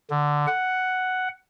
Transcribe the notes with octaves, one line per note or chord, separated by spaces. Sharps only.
D3
F#5